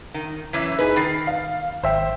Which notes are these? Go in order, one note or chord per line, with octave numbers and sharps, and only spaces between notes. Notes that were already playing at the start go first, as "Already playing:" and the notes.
D#3
F#2 E3 C#4
D#4 G#4 B4
D#3 B5 A6 C7
F5
G#1 C5 E5 G5